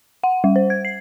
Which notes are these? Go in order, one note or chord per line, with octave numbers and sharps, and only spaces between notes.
F#5
G3
C5
G#6
C7